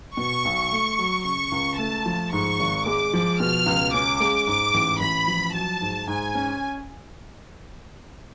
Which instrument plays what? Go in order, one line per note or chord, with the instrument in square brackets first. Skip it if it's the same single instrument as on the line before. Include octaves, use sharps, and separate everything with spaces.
[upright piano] B2 [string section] C#6
[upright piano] B1
A3
F#3
[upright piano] C#3 [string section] C#6
[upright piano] C#2
[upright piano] A3 [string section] A5
[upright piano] F3
[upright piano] G#2 [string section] C#6
[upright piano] G#1
[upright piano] G#3 [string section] D6
[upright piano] F3
[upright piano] B2 [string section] F6
[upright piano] C#2
[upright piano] C#4 [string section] D6
[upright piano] G#3
[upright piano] G#2 [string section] D6
[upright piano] A1
[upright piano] A1 [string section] B5
[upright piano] F3
[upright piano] F#3 [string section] A5
[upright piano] G#2
[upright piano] G#2 [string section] G#5
[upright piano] C#4